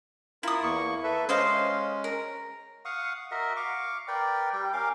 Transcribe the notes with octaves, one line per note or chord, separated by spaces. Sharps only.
E4 F4 A#4 D#6
E2 A#3 C#6
A4 B4 E5
G#3 C#4 C5 D#5 F5
A#4
F5 F#5 C#6 D#6
F#4 A#4 D#5 E5
F5 C#6 D6
A#4 B4 D5 G5
G3 G5
C#4 A#4 F5 D6